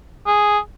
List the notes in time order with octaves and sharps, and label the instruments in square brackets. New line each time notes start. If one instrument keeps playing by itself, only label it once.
[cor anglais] G#4